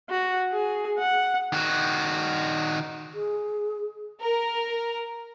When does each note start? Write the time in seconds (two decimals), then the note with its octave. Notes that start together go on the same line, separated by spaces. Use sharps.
0.10 F#4
0.52 G#4
0.99 F#5
1.53 D#3 F#4
3.14 G#4
4.21 A#4